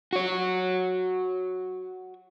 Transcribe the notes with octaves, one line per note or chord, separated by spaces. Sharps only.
F#4 C#5